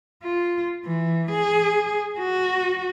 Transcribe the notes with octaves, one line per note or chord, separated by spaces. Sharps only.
F4
E3
G#4
F#4